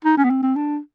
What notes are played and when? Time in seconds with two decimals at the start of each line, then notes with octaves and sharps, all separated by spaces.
0.05 D#4
0.17 C#4
0.24 B3
0.30 C4
0.43 C4
0.56 D4